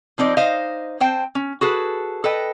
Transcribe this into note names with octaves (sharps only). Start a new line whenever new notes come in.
F3 C4 D#4 D5
D#4 C5 D#5 F5
C4 C5 G5 A5
C#4
F#4 G#4 A4 B4
A4 B4 D#5 G5